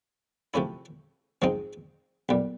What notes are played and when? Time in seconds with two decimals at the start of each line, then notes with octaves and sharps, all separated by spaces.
0.54 C3 F3 A3 C#4 E4
1.42 G#2 F3 G#3 C4 D#4
2.29 B1 A#2 G3